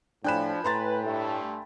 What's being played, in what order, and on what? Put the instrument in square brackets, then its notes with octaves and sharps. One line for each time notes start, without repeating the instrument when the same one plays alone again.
[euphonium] A2 [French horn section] F3 [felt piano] D4 F#6 E7 [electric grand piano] G5 G#5 B5
[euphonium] A2 [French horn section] B4 [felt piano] A#5 C6 A6
[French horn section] G2 A3